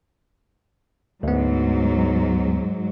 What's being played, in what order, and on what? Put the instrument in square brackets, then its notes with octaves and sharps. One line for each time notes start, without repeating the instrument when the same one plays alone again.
[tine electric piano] D2 B3 [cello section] G#2 F#3